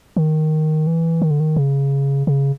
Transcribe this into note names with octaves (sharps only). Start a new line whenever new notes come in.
D#3
E3
D#3
D3
D#3
C#3
C#3